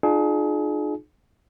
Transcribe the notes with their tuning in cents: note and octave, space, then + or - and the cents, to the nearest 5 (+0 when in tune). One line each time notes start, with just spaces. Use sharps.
D4 +45 F4 +0 G#4 +30